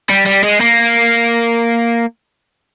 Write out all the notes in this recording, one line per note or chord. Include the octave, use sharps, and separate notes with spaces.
G3
G3
G#3
A#3